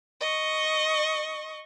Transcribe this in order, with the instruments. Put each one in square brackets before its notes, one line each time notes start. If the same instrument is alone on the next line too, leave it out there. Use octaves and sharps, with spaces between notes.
[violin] D#5 C#6